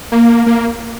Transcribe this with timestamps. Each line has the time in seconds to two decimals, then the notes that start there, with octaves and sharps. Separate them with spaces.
0.12 A#3
0.46 A#3